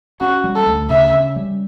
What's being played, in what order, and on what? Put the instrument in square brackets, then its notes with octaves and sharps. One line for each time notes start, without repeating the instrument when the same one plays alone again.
[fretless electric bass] C#4 [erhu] F#4
[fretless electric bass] G3
[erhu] A4
[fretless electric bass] D2
[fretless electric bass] C#3 [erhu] E5
[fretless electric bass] C#4
G3